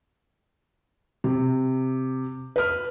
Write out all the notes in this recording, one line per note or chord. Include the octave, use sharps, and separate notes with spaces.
C3
B4 F6